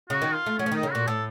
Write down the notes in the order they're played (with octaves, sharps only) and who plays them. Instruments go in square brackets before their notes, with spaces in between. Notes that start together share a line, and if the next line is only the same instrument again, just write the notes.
[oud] C#3 [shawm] F#4
[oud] D#3
[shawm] F4
[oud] A3
[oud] F#3 [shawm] C#4
[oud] F3
[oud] D#3 [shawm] D#4
[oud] C#3
[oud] A#2 [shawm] F#4
[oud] A2 [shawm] A4